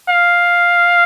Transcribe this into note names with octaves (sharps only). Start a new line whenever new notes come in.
F5